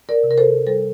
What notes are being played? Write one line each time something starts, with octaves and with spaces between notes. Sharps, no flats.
A#4 D5
C3
A#4
A4 C5
G3 A4 C5